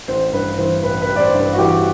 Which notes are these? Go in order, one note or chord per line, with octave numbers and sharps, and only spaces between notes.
A1 C5
G2 B4
E3 C5
A1 B4
B4
A1
D5
C5
G2
B4
F#4
E3 G4